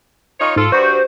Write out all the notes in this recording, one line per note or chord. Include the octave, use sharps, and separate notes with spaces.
D#4 F4 C#5
G#2 F4 A4
G2 F#4 C5